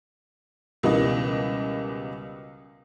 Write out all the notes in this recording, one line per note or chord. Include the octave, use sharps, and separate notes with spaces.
C#2 B2 E3 G3 A#4 D#5